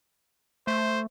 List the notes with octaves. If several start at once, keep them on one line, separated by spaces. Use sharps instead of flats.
A3 C5